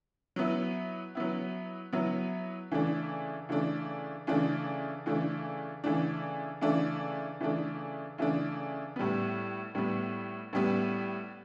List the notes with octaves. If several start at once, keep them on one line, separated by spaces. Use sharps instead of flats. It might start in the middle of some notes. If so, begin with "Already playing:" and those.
F#3 B3 E4
F#3 B3 E4
F#3 B3 E4
C#3 E3 A3 D4
C#3 E3 A3 D4
C#3 E3 A3 D4
C#3 E3 A3 D4
C#3 E3 A3 D4
C#3 E3 A3 D4
C#3 E3 A3 D4
C#3 E3 A3 D4
A2 G3 B3
A2 G3 B3
A2 G3 B3